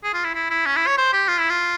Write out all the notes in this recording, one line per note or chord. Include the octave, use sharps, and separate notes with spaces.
G#4
F4
E4
E4
E4
C#4
E4
C#5
C5
G4
F4
E4
F4